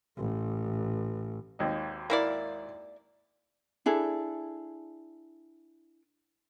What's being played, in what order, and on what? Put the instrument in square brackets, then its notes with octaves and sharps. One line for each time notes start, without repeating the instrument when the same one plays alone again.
[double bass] A1
[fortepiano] G#1 D#2 D#5
[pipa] A#3 E4 D5
[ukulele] D4 E4 G#4 A4